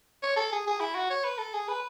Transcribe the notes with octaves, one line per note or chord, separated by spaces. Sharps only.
C#5
A4
G#4
G#4
E4
F#4
C#5
B4
A4
G#4
B4